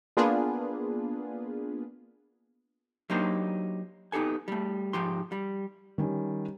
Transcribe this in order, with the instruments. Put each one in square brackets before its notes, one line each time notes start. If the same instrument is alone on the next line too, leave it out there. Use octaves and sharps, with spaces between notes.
[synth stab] A#3 B3 D4 F4 G#4 B4
[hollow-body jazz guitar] F#3 A#3 D4 D#4 G4 C5
B3 D#4 G4 A4 G#5
G3 A3
G#2 F3 G4 C6
G3
[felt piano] D#3 G3 C#4